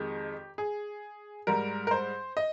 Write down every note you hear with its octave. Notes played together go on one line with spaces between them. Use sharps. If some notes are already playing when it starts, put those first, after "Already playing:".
Already playing: F2 D#3 G#3 G4
G#4
G#2 G3 A#4
A#4
C5
D#5